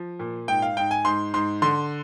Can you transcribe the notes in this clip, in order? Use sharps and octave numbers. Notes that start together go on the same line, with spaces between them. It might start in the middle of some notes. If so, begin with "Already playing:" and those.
Already playing: F3
A#2
G#2 G5
F5
G#2 G5
G#5
G#2 C6
G#2 C6
D3 C6